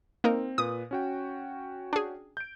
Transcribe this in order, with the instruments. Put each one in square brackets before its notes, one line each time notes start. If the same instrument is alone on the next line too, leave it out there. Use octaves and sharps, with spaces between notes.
[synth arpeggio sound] A#3 D#4 A#4 [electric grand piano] C4
[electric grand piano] A#2 B4 [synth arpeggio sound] D#6
[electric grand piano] C#4 F#4 G5
[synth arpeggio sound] D4 G#4
[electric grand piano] G6 D7